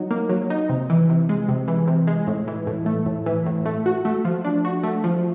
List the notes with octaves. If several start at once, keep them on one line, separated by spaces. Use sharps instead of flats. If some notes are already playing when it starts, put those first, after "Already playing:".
Already playing: F#3 D#4
A#3
F#3
D#4
C3
E3
C3
G#3
C3
E3
C3
G#3
A2
E3
A2
A3
A2
E3
A2
A3
F#4
A3
F3
D4
F#4
A3
F3